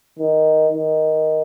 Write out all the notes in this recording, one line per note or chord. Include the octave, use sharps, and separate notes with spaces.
D#3
D#3